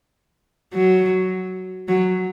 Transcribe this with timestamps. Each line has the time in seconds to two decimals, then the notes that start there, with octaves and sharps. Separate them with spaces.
0.74 F#3
1.88 F#3